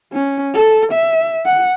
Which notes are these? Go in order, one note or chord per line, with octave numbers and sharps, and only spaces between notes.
C#4
A4
E5
F#5